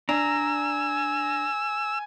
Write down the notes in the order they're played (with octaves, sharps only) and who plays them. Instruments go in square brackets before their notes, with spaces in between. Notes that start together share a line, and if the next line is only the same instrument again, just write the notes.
[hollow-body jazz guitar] D4 [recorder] G#5 [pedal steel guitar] A#5 [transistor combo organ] E6